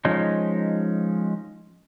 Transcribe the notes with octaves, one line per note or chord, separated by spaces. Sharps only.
F3 G#3 C#4 D#4